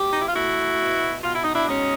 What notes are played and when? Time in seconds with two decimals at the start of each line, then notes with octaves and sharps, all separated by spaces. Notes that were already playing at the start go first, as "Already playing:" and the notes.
Already playing: B2 G4
0.12 D#4
0.20 E4
0.28 F4
0.35 A3 E4 F#4
0.80 B2
1.23 B2 F4
1.33 E4
1.44 D#4
1.54 D4 E4
1.68 G#3 C#4 D#4